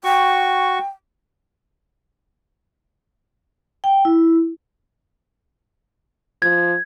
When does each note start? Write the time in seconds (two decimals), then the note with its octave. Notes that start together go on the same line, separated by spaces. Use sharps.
0.04 F#4 G5 C#6
3.84 G5
4.05 E4
6.42 F3 G#6